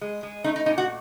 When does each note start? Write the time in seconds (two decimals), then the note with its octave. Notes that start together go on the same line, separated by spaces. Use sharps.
0.01 G#3
0.23 G#3
0.44 A3 D#4
0.56 D#4
0.66 A#2 D#4
0.78 F#4